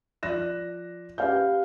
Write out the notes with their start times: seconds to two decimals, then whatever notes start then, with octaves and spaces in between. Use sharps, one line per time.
0.23 F3 D5 F#6 A#6 E7
1.18 C#4 G4 B4 F5 F#5 G6